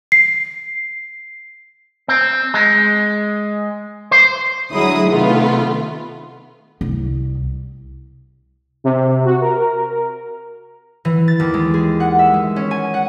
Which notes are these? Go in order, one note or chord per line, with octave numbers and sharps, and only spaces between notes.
C7
C4
G#3
C5
D2 F#3 G#3 E4 D#6
C3 D#3 A3 B3 F4
C2
C3
F#4
A#4
E3
A6
D#2
G#3
G#4
F#5
E5
G#3
C#4
G#5
F#5